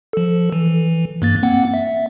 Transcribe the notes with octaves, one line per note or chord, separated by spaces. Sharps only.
F3 A4
E3
G2 A#3 A6
A#3 C4 F#5
E5